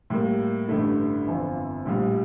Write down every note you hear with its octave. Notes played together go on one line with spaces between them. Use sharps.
A2 G3 A#3
A1 G2 D3 A3 E4
G1 F2 E3
A#1 A2 G3